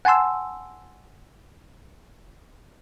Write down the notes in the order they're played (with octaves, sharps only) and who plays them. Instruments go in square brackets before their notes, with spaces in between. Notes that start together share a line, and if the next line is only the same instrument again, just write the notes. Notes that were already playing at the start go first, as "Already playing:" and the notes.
[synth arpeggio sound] F#5 G#5 A5 C6 E6